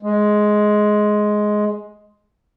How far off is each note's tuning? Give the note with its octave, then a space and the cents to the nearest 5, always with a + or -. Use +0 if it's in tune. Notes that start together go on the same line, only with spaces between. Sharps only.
G#3 +10